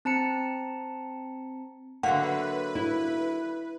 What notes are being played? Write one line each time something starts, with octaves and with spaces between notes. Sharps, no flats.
C4 A5 A#5 C#7
D3 F#3 A#3 B4 E5 F#5
E4